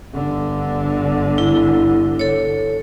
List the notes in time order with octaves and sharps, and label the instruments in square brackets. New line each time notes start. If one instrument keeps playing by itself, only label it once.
[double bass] G1 D3
[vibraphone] E4
A4 C#5